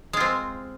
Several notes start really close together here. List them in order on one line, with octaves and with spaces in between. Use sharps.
G#3 F4 C4